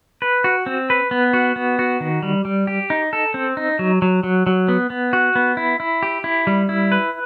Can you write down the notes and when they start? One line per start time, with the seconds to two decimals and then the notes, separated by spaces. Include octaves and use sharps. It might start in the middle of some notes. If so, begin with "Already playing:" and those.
0.22 B4
0.44 F#4
0.66 C4
0.90 B4
1.11 B3
1.33 F#4
1.56 B3
1.79 F#4
2.00 D#3
2.23 G3
2.45 G3
2.67 G4
2.90 D#4
3.13 A4
3.34 C4
3.57 D#4
3.79 F#3
4.02 F#3
4.23 F#3
4.47 F#3
4.68 B3
4.90 B3
5.13 F#4
5.35 B3
5.57 E4
5.80 E4
6.03 G4
6.24 E4
6.47 G3
6.69 E4
6.92 B4